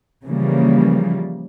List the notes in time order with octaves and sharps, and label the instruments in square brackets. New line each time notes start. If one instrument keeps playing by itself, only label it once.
[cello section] C#3 E3 F3 G3 A#3